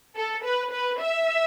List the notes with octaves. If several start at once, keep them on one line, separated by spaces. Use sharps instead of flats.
A4
B4
B4
E5